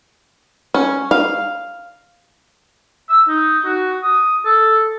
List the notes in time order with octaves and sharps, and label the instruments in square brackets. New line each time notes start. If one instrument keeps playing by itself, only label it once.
[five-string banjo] C#4
F5
[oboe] E6
D#4
F#4
D#6
A4